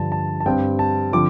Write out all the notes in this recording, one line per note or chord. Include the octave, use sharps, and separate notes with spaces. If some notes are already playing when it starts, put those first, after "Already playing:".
Already playing: G2 D3 F3 A5
A5
A5
G2 G3 C4 G5
A5
D3 F3 C4 D6